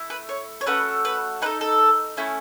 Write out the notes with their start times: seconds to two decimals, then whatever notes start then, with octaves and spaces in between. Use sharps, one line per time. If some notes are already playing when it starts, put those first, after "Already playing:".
Already playing: A3 E4
0.10 B4
0.29 C#5
0.61 C#5
0.66 A3 C#4 F#4 A4 B4
1.05 B4
1.42 D#4 B4
1.46 A4
1.61 A4
2.17 A3 C#4 E4